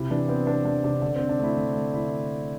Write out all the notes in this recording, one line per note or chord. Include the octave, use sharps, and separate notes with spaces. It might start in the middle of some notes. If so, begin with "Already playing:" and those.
Already playing: C3 E4
E3 D4
B3 C4
B3 D4
E3 D4
C3 D4
D3 D4
C4
D3
D4
A3 E4
D3
A3
D3 E4